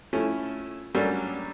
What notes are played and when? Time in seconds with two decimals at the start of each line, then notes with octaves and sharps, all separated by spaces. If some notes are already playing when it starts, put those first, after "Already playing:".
0.13 F3 A3 C#4 E4
0.95 F#3 G3 A3 A#3 C#4 D4